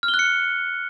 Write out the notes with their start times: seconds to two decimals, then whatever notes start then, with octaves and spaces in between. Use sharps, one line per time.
0.03 F6
0.08 G7
0.14 F#6
0.19 C#7